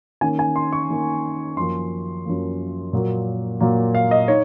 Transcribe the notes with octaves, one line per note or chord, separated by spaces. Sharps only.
D#3 A#3 C#4 G#5
G#5
C6
C#6
D#3 A#3 C#4
F#2 F3 A#3 C6
F#2 F3 A#3
A#2 F#3 A#3
A#2 F#3 A#3
F5
D#5
D#4 C#5